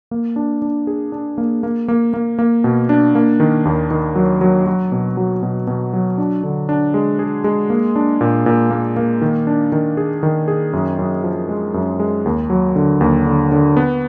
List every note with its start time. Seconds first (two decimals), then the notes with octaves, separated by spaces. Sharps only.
0.11 A#3
0.36 D4
0.62 D4
0.87 G#4
1.12 D4
1.38 A#3
1.63 A#3
1.88 A#3
2.14 A#3
2.39 A#3
2.64 B2
2.89 D4
3.15 A#3
3.40 D#3
3.65 D#2
3.91 D#3
4.15 F#3
4.41 F#3
4.66 F#3
4.92 B2
5.17 F#3
5.43 B2
5.67 B2
5.93 F#3
6.18 D4
6.43 D3
6.69 D4
6.94 G#3
7.19 G#4
7.44 G#3
7.70 A#3
7.96 D4
8.21 A#2
8.46 A#2
8.71 A#3
8.96 A#3
9.22 D#3
9.47 D4
9.72 D#3
9.97 G#4
10.23 D#3
10.48 G#4
10.73 F#2
10.99 F#2
11.24 F3
11.49 G#3
11.74 F#2
12.00 G#3
12.25 D#2
12.50 F#3
12.76 D3
13.01 D#2
13.26 D3
13.52 D3
13.77 B3